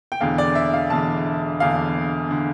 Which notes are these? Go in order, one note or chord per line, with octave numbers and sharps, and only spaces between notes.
G5
E1 E2 D3 F5
D5
E5
F5
E1 E2 D3 A5
E1 E2 D3 F5
D3